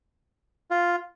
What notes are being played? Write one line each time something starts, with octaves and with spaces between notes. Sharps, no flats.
F4